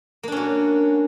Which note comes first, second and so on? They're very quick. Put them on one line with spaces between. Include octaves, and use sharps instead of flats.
A#3 D4 C#4 F#4